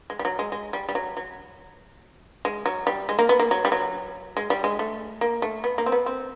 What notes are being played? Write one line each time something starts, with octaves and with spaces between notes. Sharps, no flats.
G#3
G3
F#3
G#3
G#3
G3
G3
F#3
F#3
G#3
F#3
G3
G#3
A#3
B3
A#3
F#3
G3
F#3
G#3
G3
G#3
A3
A#3
A3
B3
A#3
C4
B3
C4